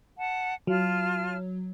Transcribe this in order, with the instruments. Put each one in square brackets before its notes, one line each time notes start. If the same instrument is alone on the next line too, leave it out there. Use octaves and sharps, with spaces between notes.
[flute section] F#5 A5
[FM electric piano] F#3 [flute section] F4 A5 F6